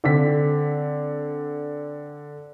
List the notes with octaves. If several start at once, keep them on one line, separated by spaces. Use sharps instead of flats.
D3 C4 B6